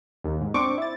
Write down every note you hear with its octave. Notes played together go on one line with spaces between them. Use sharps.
D#2
G#2
C4 D4 C#6 D6
E4 A6